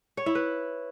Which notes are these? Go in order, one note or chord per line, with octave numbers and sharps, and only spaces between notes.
C#5
E4
B4